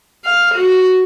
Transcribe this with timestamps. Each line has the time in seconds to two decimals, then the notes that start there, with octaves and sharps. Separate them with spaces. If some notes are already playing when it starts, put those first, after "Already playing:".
0.25 F5
0.55 F#4